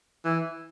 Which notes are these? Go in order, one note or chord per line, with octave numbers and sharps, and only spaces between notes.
E3